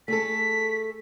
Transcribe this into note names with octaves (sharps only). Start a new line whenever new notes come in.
A3 G#4 A4 B6